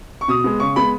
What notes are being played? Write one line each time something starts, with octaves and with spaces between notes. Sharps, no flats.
C#6
B2 D#6
G#3 B3
C#3 C#6
G#3 B3 B5